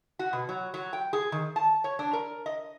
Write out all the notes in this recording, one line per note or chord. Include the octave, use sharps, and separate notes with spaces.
F#4
B2
F#3
F#3
G5
G#4
D#3
A5
C#5
D4
A#4
D#5